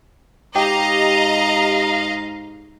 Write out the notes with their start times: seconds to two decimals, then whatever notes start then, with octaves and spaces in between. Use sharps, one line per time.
0.56 G#2 G4 D#5 F5 A#5